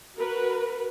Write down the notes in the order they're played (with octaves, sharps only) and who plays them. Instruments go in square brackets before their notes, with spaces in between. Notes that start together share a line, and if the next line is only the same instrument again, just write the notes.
[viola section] F#4 A#4 B4